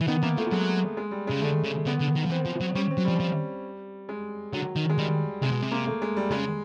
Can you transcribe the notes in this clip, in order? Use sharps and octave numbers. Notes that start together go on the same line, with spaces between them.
E3
D#3 B3
E3 A#3
F3 A3
F#3 G#3
G#3
G3
C#3 G#3
D3 A3
C#3
D3 B3
D3
D#3
F3
E3 C4
F3
F#3
G3 C#4
C4
F#3
F3 G3
F3
G#3
D3 F#3
D#3
G#3
D#3 G3
C3 G#3
B2
C3
A#3
A3
G#3
G3
C#3 G#3